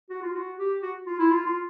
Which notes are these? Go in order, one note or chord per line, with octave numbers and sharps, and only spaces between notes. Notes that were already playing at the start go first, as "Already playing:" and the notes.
F#4
F4
F#4
G4
F#4
F4
E4
F4
F4